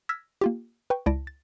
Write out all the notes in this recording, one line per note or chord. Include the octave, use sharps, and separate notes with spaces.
E6 F6 G#6 A#6 B6
A#3 F4 G4
B4 G5 C#6
C#2 E4 D5 A5 A#6 D7
A6